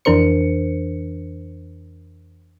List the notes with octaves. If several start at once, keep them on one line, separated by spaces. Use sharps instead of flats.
F2 E3 D4 A#4 C5 C#7